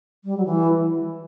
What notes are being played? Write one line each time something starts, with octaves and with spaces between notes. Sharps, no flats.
G3
F#3
E3